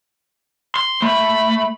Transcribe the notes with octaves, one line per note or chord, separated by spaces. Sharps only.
C6
A3 B5